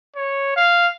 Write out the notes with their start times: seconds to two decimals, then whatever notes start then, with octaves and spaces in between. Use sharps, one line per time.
0.16 C#5
0.57 F5